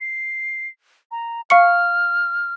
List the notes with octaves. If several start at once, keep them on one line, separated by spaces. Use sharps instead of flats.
C7
A#5
F5 C#6 F6 C#7